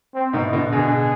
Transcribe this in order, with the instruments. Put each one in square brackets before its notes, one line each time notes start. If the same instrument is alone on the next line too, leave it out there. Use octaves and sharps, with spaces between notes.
[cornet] C4
[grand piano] G#2 B2
[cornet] E4
[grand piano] B2 D3
[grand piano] B2 D3 [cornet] G#4